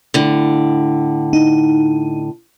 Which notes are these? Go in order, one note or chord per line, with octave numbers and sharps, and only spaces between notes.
A2 D3
D#4